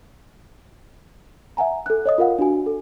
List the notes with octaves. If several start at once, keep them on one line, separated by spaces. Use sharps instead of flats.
E5 F#5 G#5 A#5
A4 F#6
C#5 D#5 D#6
F4 A#4 F5 F#5
D4 F#4 G#5
A4